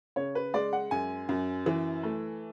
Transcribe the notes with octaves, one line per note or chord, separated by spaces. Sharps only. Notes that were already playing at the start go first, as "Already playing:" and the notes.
C#3 C#5
B4
G#3 D5
F#5
F#2 G#5
F#2
E3
A3